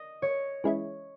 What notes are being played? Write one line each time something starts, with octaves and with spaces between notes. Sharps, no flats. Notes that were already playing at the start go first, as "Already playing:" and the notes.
Already playing: D#5
C#5
E3 G#3 C#4 E4